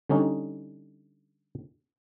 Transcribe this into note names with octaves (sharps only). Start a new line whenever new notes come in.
D3 G3 C#4 D#4